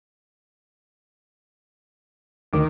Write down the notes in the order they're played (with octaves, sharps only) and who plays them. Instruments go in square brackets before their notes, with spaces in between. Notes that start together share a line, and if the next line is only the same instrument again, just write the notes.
[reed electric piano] D2 A#4 D6 [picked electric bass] D#3